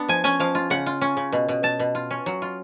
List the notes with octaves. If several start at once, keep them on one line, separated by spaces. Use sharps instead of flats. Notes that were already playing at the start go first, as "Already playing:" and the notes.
Already playing: B3 D4
F3 G#5
C#4 G#5
F3 F5
F4
C#3 F#5
F4
C#4
C#3
B2
B2
B2 A5
B2
F4
C#4
F#3
F4